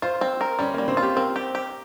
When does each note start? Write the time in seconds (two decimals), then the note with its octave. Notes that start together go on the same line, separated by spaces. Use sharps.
0.02 F4 C5
0.21 C4
0.41 A#4
0.59 G3 C#4
0.74 G3 A#3
0.88 C4
0.97 F4
1.02 G4
1.16 C4 A#4
1.36 G4
1.55 G4